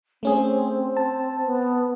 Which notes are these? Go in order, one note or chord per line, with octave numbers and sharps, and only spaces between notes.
A3 C4 C#4 G#4
A5
B3